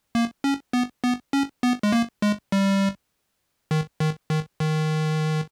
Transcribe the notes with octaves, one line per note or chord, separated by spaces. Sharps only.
A#3
C#4
B3
B3
C#4
B3
G#3
A#3
G#3
G3
D#3
D#3
D#3
D#3